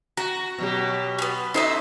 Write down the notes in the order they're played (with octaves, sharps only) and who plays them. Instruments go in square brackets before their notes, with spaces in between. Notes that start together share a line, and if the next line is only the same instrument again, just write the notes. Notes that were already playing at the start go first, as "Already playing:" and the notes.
[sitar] F#4 [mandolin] A#5
[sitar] B2 F#3 G4
[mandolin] B3 C#4
[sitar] D#4 F#4 A4 [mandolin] C5 D#5 E5